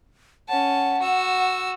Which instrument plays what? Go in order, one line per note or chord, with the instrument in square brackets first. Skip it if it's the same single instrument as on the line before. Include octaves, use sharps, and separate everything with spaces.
[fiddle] C#4 A5 [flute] F#5
[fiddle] F#4 E6